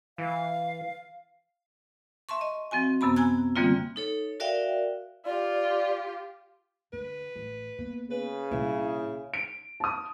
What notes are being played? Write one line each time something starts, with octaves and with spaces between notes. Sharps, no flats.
E3 F5
E5 A5 C6 C#6
D#5
F3 C4 F#4 G#5
F#2 C3 B3 A5 B5
G#5 A#5 E6 F#6 G#6
D3 E3 G3 A#3 C4 F4
D#4 A4 C#5
F#4 A#4 D5 E5 F5 G5
F4 G4 D5
D3 B4
A1
A#3 B3
C#3 B4
C2 A#2 E4
D7
A5 D#6